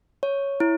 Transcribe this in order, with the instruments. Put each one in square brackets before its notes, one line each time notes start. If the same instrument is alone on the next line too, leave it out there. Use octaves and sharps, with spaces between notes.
[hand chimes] C#5
E4